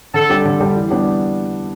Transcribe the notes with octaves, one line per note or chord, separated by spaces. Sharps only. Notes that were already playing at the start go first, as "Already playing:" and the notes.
D3 A4
G3 D4 G4
D3
G3 D4 G4
E3
G3 B3 D4 G4